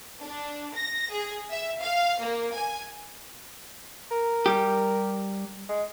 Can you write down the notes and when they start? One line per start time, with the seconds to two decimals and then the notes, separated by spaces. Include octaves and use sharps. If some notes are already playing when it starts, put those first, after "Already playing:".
0.24 D4
0.76 A#6
1.12 G#4
1.50 E5
1.82 F5
2.20 A#3
2.55 G#5
4.11 A#4
4.46 G3 G4
5.69 G#3